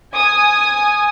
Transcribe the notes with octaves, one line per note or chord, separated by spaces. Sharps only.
G#5 D#6